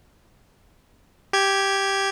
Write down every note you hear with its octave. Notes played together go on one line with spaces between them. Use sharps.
G4 G#6